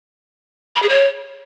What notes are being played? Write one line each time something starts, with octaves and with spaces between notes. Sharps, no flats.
B5
G#4
C#5